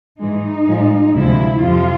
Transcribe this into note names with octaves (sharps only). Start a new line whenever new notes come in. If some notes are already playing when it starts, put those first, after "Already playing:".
G#2 E3 G#3 D#4
A2 F3 G#3
D2 C3 F3 G#3 E4
F2 C3 F3 F4